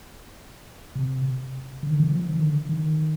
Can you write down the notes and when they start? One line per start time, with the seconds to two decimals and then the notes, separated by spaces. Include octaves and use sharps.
0.95 C3
1.83 D3
1.91 D#3
2.00 D3
2.11 F3
2.29 D#3
2.41 D3
2.69 D#3